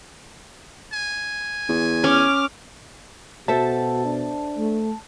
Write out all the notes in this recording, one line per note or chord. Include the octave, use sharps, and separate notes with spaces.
G#5
E2
C#4 D6 F6
B2 F#4 A4 C5 E5 A5
D4
A3